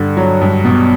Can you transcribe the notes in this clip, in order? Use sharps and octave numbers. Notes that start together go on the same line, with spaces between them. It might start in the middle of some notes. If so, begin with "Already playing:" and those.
Already playing: G2 D3
F#3
G2
B2